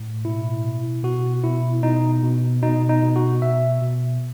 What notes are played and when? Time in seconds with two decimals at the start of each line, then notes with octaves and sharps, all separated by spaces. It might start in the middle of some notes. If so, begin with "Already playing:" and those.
Already playing: A2
0.25 B2 E4
0.64 B2
1.03 B2 F#4
1.44 B2 E4
1.83 B2 D#4
2.23 B2
2.62 B2 D#4
2.89 D#4
3.02 B2
3.16 F#4
3.42 B2 E5
3.82 B2